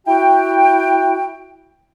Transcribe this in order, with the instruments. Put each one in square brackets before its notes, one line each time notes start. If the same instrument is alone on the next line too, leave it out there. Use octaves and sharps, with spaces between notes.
[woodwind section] E4 F#4 G5